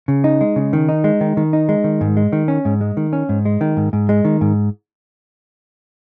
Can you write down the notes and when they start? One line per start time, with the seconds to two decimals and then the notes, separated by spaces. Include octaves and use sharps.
0.08 C#3
0.24 D#4
0.41 G#3
0.56 C#3
0.73 D#3
0.89 D#4
1.04 G#3
1.21 D#3
1.37 D#3
1.53 D#4
1.69 G#3
1.84 D#3
2.01 G#2
2.17 G#3
2.32 D#3
2.48 C#4
2.65 G#2
2.81 G#3
2.97 D#3
3.13 C#4
3.29 G#2
3.45 G#3
3.61 D#3
3.77 G#2
3.93 G#2
4.09 G#3
4.25 D#3
4.41 G#2